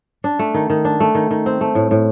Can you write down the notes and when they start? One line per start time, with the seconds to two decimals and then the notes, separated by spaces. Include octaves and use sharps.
0.24 D4
0.39 A3
0.54 D#3
0.70 D#3
0.85 D4
1.00 A3
1.15 D#3
1.31 D#3
1.46 C4
1.61 A3
1.75 A2
1.91 A2